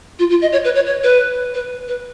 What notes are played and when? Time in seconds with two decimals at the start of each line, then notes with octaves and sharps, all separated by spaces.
0.19 F4
0.30 F4
0.42 D#5
0.52 C#5
0.65 B4
0.75 C#5
0.86 C#5
1.03 B4
1.54 B4
1.88 B4